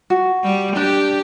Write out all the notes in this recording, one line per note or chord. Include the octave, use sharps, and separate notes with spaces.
F#4
G3
D4 G4